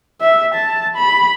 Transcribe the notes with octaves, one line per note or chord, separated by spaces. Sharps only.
E5
A5
B5